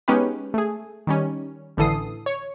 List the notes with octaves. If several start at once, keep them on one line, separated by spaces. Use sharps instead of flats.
G#3 B3 C#4 D#4 G4 B4
A3 G#4
D#3 G3 C#4
A1 D3 E3 A4 D#6 C7
C#5